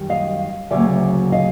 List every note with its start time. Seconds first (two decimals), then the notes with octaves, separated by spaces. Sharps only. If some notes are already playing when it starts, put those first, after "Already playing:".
Already playing: F#2 D#3 G3
0.09 D#5 F5
0.71 D2 C#3 F#3 A#3 D5 E5
1.32 D#5 F5